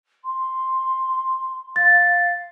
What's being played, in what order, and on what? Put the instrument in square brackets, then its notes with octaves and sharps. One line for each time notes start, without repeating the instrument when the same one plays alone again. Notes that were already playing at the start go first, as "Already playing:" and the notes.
[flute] C6
[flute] F5 [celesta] A6